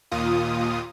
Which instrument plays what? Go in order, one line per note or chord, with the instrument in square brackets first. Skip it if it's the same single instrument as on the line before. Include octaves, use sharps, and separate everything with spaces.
[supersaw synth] D#2 A#2 F4 D#6